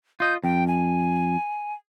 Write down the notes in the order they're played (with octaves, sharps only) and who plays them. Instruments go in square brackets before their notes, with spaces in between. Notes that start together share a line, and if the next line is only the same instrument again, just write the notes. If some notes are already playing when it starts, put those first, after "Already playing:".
[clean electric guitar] F4 D#5 [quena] G6
[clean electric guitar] F2 [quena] G5
[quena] G#5